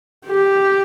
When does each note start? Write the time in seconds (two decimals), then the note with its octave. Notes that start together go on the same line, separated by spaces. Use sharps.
0.26 G4